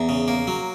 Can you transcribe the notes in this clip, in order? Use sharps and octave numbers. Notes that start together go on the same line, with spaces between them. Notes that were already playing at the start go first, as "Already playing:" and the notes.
Already playing: E2 A#5
C#3
A#3
F#3